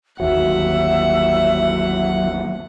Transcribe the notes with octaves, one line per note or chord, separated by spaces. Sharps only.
G1 D#2 D#3 F#3 E5 F#5